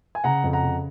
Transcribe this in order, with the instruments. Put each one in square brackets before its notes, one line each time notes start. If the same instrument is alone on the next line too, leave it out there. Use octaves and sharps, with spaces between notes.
[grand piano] G#5
C#3 F#5 A#5
F2
F#5 A#5
C#3